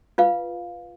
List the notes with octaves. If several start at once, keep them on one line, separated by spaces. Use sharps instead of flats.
F4 B4 F5